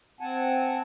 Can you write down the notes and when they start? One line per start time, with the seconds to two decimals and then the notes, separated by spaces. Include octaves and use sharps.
0.20 C4 F#5 G#5 A5